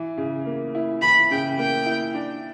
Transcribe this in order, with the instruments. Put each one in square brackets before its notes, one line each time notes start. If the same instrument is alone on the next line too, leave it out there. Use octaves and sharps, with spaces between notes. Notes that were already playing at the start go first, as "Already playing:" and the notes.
Already playing: [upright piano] E3
C#3
A#3
E4
[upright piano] E3 [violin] B5
[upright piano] C#3 [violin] G5
[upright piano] A#3 [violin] G5
[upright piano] E4
D4